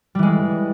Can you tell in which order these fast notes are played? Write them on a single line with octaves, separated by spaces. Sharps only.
G3 E3 G#3